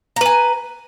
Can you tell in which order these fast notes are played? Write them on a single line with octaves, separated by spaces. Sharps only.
A#5 B4 G#5